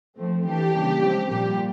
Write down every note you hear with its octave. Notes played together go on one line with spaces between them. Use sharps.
F3 A3 C4
E3 A3 D4 G4
C#3 E3 G3 A#3 D4
F3 G#3 C4
A#2 G3 A#3 G4